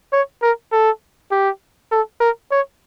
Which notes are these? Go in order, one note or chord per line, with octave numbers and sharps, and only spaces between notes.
C#5
A#4
A4
G4
A4
A#4
C#5